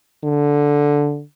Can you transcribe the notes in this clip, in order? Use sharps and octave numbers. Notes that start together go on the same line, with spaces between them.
D3